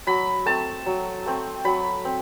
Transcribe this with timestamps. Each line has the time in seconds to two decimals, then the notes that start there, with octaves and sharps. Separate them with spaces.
0.07 F#3 B5
0.46 A3 C4 A5
0.86 F#3
1.26 A3 C4
1.65 F#3 B5
2.05 C4